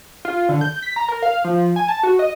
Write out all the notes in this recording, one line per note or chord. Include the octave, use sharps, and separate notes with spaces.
F4
D3
G6
B6
A#5
A#4
F5
F3
G#5
A5
F#4
D#5